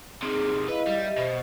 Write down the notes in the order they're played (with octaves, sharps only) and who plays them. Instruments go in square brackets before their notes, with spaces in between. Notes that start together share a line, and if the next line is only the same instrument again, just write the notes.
[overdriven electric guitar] C3 D#3 [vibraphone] G#4
[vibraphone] E4 D#5 F5 [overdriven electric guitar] B4
[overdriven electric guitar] G3
[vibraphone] G4 D#5 E5
[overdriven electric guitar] B2 [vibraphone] C5